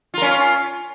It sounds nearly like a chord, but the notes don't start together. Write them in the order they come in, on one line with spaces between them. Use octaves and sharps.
F4 A#4 C#4